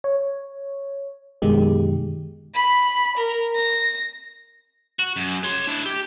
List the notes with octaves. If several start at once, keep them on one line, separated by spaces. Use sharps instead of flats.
C#5
F#2 B2 D#3 G#3 G4
B5
A#4
A#6
F#4
F#2
C#5 C6
D4 E4
G4